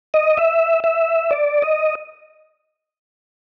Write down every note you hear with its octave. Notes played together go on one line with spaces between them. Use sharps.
D#5
E5
E5
D5
D#5